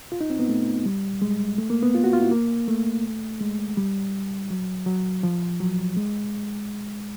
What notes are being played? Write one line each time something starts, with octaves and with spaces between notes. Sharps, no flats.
F4
D#4
C4
B3
A3
G3
G#3
A3
A#3
B3
F4
F#4
F4
E4
A#3
A3
G#3
G3
F#3
F#3
F3
F#3
G#3